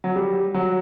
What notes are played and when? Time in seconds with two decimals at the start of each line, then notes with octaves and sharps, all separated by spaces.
0.04 F#3
0.16 G3
0.54 F#3